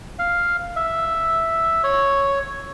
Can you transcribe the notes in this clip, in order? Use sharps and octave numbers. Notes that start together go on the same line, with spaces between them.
F5
E5
C#5